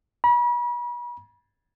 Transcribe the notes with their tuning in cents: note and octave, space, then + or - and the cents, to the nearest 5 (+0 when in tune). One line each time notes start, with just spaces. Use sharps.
B5 -40